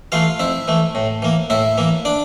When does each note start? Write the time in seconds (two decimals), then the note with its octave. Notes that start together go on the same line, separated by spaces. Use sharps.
0.12 E3 A3 F4 F5
0.39 F2 E4 E5
0.68 E3 A3
0.95 A2
1.22 E3 A#3
1.50 A2 E4 E5
1.78 E3 A#3
2.05 D4 D5